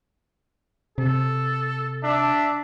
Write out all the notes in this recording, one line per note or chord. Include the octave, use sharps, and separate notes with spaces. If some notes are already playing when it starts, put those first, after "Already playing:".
C3 A4
D4 E5